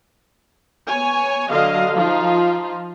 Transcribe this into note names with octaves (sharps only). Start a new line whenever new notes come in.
B3 C#5 G#5
D3 F#3 D#5 F5
F3 D#4 F4